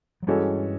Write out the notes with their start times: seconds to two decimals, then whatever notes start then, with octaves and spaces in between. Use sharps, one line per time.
0.23 F#3
0.27 G2 E3 G3 G#3 C#4 F#4 A4